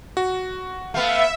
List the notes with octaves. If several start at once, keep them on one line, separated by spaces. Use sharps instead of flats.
F#4
A3 B3 E5 F5